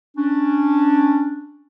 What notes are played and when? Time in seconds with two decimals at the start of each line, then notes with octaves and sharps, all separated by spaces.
0.17 C#4 D4